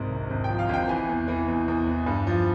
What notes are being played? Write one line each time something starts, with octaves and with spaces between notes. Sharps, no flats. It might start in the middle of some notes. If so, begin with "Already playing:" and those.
Already playing: C2 G#2 C4 A#4
G#1
G#1
F3 G5
F5
G#1 G5
E3 G#5
E2
E3
E2
E2
E3
G2
F3